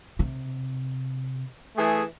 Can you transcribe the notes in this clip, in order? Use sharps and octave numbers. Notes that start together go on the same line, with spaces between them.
C3
E3 A3 G#4